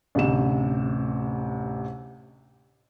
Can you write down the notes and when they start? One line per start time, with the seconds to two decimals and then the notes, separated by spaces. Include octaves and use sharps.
0.15 A1 D2 C3 E7